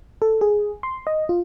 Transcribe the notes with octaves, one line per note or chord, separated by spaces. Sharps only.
A4
G#4
C6
D#5
F4